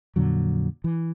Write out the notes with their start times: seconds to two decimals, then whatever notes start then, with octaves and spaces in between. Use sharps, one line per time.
0.16 F2 A#2 D3 F#3
0.84 E3